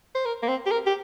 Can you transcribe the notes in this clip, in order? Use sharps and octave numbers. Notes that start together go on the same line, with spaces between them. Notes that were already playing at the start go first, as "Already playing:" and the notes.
C5
A#4
A#3
C4
G4
A#4
G4